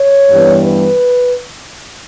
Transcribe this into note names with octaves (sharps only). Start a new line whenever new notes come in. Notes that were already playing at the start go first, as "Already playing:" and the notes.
Already playing: C#5
G2 E3 G3 B3
B4